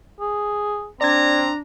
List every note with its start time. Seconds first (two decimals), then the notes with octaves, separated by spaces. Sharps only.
0.20 G#4
1.01 C4 D4 D5 A#5 G#6